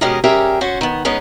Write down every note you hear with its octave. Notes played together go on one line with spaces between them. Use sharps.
B2 G#3 C#4 G4 A#4 D#5
G3 C#4 G4 G#4 A#4 E5
C#4 F#4 C5
D#3 B3
G#3 B3 C#4 D#4